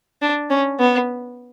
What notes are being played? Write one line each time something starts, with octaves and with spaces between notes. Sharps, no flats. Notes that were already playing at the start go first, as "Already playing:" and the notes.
D4
C#4
B3